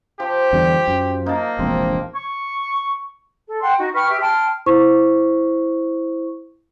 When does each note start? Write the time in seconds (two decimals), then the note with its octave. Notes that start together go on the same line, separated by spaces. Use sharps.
0.20 F3 G4
0.53 E2 D3 G3
0.88 F#2
1.26 A#3 D#4 A5
1.59 E1 A#1 C3 C4
2.15 C#6
3.47 A4
3.61 F#5 G5 C6
3.79 D#4 F#4
3.94 B4 G5 C#6 F6
4.08 G4 E5
4.21 G5 A5 C6 F6
4.66 E4 C5 C#6